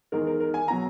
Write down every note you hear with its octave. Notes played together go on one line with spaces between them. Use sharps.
E2 D#3 G#3 A#4
A#4
A#4
G#5
B2 F#3 A#5